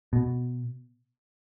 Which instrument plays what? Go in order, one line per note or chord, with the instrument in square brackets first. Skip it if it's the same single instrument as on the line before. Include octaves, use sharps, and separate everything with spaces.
[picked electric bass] B2